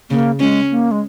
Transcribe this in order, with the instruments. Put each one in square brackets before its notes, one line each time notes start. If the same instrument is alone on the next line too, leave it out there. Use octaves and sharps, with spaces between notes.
[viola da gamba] C#3 [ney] A#3
[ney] G#3 [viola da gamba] C#4
[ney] A#3
G#3